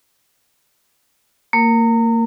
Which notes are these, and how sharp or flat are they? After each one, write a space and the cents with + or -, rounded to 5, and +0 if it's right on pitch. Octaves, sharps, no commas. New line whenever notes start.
A#3 -30 A#4 +0